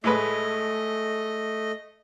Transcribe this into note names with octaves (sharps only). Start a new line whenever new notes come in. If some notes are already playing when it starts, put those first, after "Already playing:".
A2 G#3 A3 B4 D#5